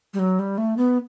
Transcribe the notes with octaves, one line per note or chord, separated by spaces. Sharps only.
G3
F#3
G3
A3
B3